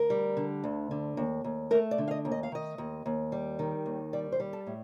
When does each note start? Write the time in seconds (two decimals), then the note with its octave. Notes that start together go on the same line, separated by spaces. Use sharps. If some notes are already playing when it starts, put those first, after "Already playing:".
Already playing: D2 A#4
0.10 G3
0.37 D3
0.64 D2
0.91 D3
1.17 D#2
1.44 D#2
1.71 A3 A#4
1.91 D5
1.98 D3
2.08 F5
2.11 D#5
2.25 D#2
2.31 D#5
2.43 F5
2.52 D#3 D#5
2.78 D#2
3.06 D#2
3.32 G3
3.59 D#3
3.86 D#2
4.13 G3 D5
4.32 C5
4.40 G3
4.53 A4
4.67 A2